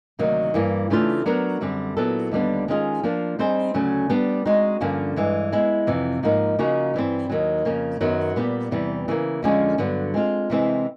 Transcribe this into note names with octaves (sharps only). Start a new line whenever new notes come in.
D2 C3 D#3 F#3 A#3
G2 E3 G3 A#3
C#3 E3 A3 D4 F4
F#3 B3 D4 F#4 A#4
F#2 D3 G3 C4
A#2 F#3 B3 E4 A4
D#2 D3 G3 B3 D4
D#3 G#3 C#4 F4 G#4
F3 A#3 D4 F4
G3 C4 D#4 G#4 C5
D2 C#3 F#3 A3 C#4
G3 B3 D4 G4
G#3 C4 D#4 F#4
G2 D3 F3 A#3 C#4
G2 E3 G#3
G#3 B3 E4
F2 C3 E3
G#2 F3 A#3 D#4
C#3 F3 A#3 D#4 F#4
G2 E3 G3 C4
D#2 D#3 F#3
F2 C#3 F3 A#3
F#2 D#3 F#3 B3
A#2 G3 B3 E4 G4
E2 C3 E3 G3
C#3 E3 G3 A#3
F2 D3 F3 G#3 C#4
G2 D3 F#3 B3
G#3 C4 F4
C3 E3 G#3 C4